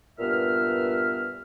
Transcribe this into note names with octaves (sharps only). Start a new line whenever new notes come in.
G2 A#2 B3 B4 E5 F6